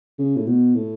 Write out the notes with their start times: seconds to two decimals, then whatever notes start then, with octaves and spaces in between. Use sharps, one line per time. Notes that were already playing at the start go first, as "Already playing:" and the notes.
0.19 C#3
0.37 A2
0.47 B2
0.75 A2